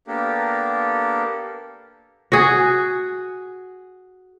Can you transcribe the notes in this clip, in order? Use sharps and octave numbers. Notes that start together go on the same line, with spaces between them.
A#3 B3 D4 G4 A4 A#4
F#4 G#4